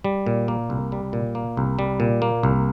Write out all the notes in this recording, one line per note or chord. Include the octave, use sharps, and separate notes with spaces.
G3
A#2
A#3
C2
G3
A#2
A#3
C2
G3
A#2
A#3
C2